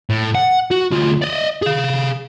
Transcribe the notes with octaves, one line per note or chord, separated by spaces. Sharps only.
A2
F#5
F#4
D2 F4
D5 D#5
G#4 F5